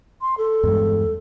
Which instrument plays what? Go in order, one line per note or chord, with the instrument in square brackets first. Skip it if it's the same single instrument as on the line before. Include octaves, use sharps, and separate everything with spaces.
[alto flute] C6
A4
[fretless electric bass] E2 G2 G#3